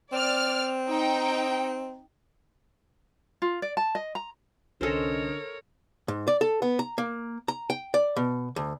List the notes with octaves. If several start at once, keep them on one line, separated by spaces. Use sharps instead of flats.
C4 D5 F6
D#4 G5
F4
D5
A5
D#5
A#5
C2 D3 C#4 A4 A#4 C5 C#5 D#5
G#2
D5
A4
B3
A#5
A#3
A#5
G5
D5
B2
D2